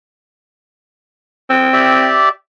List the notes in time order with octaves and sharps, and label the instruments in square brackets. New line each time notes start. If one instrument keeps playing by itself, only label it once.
[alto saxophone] C4
[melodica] G4 D5 E5